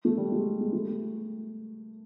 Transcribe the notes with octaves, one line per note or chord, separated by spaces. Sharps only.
A3
G3
G#3
G#3
A3